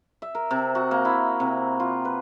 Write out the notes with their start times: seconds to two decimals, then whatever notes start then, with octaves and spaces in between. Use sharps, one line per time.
0.22 E5
0.35 A#4
0.51 C3
0.75 F#4
0.91 A#3
1.05 E4
1.40 C3
1.80 F4
2.05 B4